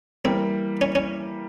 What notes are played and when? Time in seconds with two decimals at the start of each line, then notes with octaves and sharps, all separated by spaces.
0.24 E3 G3 A#3 C4
0.81 C#4
0.95 C#4